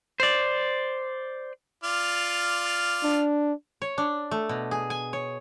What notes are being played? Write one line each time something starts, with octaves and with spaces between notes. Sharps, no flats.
C5 D5
F4 D5 F6
D4
C#5
D4
A3
B2
G#4
G#5
C#5